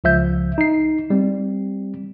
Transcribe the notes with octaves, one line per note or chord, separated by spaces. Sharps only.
C#2 F3 E5 G6
D#4 C7
G3 C4